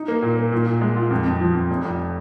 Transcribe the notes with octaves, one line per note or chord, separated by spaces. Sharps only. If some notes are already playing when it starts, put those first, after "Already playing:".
Already playing: D#4
A#3
A#2
A#3
A#2
A#2
G#3
F4
F2
F2
F3
F2
F1
F2